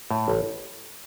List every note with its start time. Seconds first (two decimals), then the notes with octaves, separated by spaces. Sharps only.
0.11 A2
0.28 A1